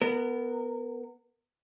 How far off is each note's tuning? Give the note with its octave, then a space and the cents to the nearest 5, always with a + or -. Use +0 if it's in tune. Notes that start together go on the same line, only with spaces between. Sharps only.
B3 +0 A#4 -25